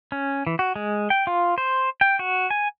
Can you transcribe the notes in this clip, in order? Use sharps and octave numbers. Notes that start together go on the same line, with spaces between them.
C#4
E3
F#4
G#3
G5
F4
C5
G5
F#4
G#5